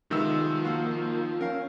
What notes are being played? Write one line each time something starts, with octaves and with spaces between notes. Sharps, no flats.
C3 D#3 F3 G#3 B3 E6
A#3 F#4 F5
C#4 A#4 F5